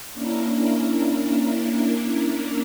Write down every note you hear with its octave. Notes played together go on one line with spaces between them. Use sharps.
A#3 C#4 D4 E4 A#4